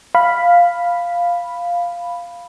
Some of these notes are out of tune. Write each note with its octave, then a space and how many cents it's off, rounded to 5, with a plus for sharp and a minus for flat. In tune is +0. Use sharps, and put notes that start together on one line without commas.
F5 +0 B5 +0